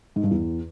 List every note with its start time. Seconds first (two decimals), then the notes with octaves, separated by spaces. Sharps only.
0.16 G#2
0.24 G2
0.31 E2